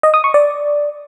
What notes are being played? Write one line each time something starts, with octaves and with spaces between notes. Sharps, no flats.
D#5
D#6
C#6
D5